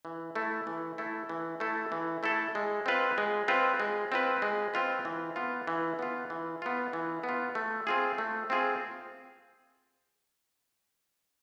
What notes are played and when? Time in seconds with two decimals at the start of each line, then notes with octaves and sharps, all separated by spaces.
0.05 E3
0.35 A3 E4 A4
0.67 E3
0.98 A3 E4 A4
1.29 E3
1.60 A3 E4 A4
1.92 E3
2.23 A3 E4 A4
2.55 G#3
2.86 C4 F4 B4
3.18 G#3
3.48 C4 F4 B4
3.80 G#3
4.12 C4 F4 B4
4.42 G#3
4.74 C4 F4 B4
5.05 E3
5.36 B3 F4
5.67 E3
5.99 B3 F4
6.30 E3
6.62 B3 F4
6.93 E3
7.24 B3
7.29 F4
7.55 A3
7.87 C4 F4 G#4
8.18 A3
8.50 C4 F4 G#4